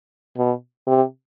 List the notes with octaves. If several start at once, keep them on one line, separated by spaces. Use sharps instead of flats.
B2
C3